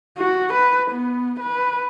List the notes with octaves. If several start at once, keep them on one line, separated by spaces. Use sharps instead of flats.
F#4
B4
B3
B4